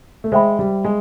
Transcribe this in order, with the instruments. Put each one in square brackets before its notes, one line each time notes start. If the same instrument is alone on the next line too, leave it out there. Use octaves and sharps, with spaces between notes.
[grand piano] A3
[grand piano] G#3 [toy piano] C5 E5 G5 B5
[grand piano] G3
G#3